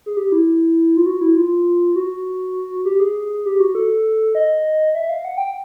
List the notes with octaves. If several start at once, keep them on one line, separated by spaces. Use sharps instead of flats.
G#4
G4
E4
F4
F#4
E4
F4
F#4
G4
G#4
G4
F#4
A4
D#5
E5
F5
F#5
G5